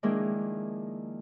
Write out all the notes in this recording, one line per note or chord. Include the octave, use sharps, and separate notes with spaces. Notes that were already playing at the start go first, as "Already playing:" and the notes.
D#3 F3 G#3 A#3 D4 E4